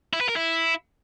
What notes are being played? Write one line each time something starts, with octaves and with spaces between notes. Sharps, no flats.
E4
B4
A#4
E4